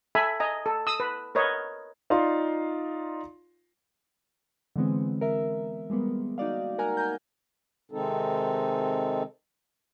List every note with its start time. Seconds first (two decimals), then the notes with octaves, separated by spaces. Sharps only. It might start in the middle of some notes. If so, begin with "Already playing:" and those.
0.15 A4 E5 G#5 B5
0.40 D#5 G#5 A#5
0.66 A4
0.87 D#6 E6
1.00 B4
1.35 A#4 B4 C#5 D#5
2.10 D#4 F4 D5 F5 C6
4.76 D3 E3 G#3 B3 C4
5.21 A#4 E5
5.90 G3 G#3 A#3 B3
6.38 D#4 F#4 D5 F5
6.78 A#4 F#5 G#5 A#5 F6
6.97 G#5 A#5 G6
7.91 C3 D#3 G#3 C4 D#4 A4